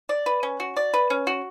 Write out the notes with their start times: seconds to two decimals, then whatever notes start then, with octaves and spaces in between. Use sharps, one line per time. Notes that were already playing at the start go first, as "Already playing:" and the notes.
0.09 D5
0.26 B4
0.43 C#4
0.60 F#4
0.77 D5
0.94 B4
1.10 C#4
1.27 F#4